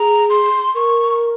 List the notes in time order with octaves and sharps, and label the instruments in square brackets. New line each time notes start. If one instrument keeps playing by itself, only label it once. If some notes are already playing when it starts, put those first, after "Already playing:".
Already playing: [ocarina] G#4 [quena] A#5
[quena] C6
[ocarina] A#4 [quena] C#6